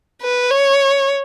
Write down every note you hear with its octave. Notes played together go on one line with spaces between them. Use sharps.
B4
C#5